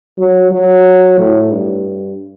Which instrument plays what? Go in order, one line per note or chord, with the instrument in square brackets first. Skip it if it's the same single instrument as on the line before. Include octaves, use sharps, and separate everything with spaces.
[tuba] F#3
F#3
A2
G2